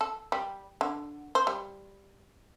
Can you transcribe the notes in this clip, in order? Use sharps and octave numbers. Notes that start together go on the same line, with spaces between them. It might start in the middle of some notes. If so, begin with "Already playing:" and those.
A4
G3
D3
C5
G3